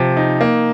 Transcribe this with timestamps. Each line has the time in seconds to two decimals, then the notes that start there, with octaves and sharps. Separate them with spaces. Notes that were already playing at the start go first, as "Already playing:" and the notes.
Already playing: C3 F3
0.17 D#4
0.41 A#3